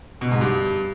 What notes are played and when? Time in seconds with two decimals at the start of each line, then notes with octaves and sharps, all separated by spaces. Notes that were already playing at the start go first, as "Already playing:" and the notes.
0.21 B2
0.31 G#2
0.41 G2